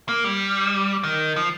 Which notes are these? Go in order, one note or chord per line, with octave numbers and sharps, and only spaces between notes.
A#3
G3
D#3
F3